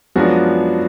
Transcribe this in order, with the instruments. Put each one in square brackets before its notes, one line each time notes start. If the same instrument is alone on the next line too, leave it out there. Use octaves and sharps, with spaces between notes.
[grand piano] F#2 F3 G#3 B3 D4 F#4